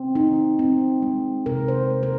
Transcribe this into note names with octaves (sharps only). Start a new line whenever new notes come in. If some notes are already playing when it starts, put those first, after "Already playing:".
Already playing: C4
D#4
C4
G#3
C3 A#4
C5
G#3
A#4